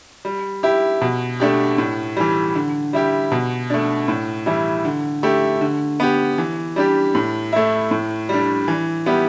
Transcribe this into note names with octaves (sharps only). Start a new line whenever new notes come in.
G3
E4 G4
B2
A3 D4 G4
A2
E3 G3
D3
G3 E4 G4
B2
A3 D4
A2
E3 G3 E4
D3
A3 E4 G4
D3
B3 G4
E3
G3 D4 G4
A2
A3 E4
A2
G3 D4
E3
G3 B3 E4 G4